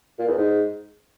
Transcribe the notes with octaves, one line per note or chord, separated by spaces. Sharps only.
A#2
E2
G#2